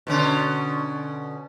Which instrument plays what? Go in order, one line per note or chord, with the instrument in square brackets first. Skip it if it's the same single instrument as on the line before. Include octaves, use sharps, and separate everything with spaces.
[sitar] B2 D3 C#4